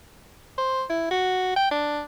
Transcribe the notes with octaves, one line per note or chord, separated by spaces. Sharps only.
C5
E4
F#4
G5
D4